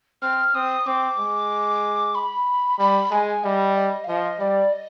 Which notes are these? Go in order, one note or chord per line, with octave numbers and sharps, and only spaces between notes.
C4 F6
C4 D#6
C4 D6
G#3
B5
G3 B5
G#3 G#5
G3 D#5
D#5
F5
F3 D#5
G3 D5
D#5